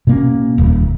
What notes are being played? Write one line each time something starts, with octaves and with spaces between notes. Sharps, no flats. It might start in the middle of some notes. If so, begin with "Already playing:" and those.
B2 A#3 C#4
D#1